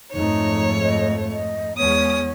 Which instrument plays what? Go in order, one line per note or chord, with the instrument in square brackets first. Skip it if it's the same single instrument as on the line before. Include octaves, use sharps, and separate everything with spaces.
[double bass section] F2 G#2 A3 [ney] D#4 [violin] C#5
[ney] D#5
D#5
[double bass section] E2 G#3 B3 [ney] C#5 [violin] D#6